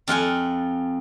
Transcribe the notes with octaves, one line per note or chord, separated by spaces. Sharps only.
F2 F4 F#5 G#5